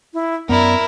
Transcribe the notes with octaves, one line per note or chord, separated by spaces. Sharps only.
E4
F#2 B3 E4 A#4 D5